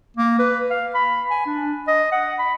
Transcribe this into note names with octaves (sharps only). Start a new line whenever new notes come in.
A#3
B4
F5
B5
G#5
D4
D#5
F#5
B5